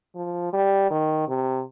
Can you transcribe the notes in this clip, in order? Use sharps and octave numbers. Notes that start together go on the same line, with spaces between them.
F3
G3
D#3
C3